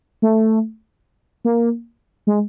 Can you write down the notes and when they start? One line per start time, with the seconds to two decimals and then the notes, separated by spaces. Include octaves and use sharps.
0.22 A3
1.45 A#3
2.27 G#3